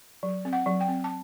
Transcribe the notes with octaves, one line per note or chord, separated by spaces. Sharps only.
F#3
C4
F#5
F#3
G5
C4
A5